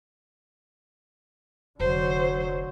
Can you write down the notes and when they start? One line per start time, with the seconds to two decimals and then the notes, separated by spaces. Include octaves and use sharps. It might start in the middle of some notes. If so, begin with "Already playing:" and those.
1.80 F1 D3 F#3 C5